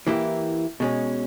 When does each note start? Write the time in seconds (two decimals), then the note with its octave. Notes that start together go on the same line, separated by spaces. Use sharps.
0.07 E3 A#3 E4 G4
0.80 B2 G#3 C#4